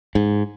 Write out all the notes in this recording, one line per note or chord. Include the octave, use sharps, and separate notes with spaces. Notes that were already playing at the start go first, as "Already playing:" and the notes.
G#2